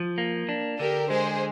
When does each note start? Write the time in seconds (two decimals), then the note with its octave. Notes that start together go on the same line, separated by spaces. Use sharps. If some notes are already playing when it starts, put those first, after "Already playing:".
Already playing: F3
0.18 A#3
0.49 D4
0.79 D3 G4 A#4
1.10 G#3 G#4 C5